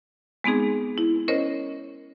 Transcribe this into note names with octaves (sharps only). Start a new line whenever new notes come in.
G#3 B3 C4 D#4 G#4
E4
C#4 A#4 C5 C#5 D#5